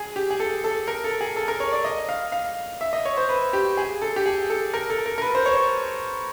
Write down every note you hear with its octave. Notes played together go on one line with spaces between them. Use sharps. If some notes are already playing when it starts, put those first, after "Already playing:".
Already playing: G#4
G4
G#4
A4
A4
A#4
A4
G#4
A4
A#4
C#5
D5
D#5
F5
F5
E5
D#5
C#5
C5
B4
G4
G#4
A4
G4
G#4
A4
A#4
A4
A#4
A#4
B4
C5
C#5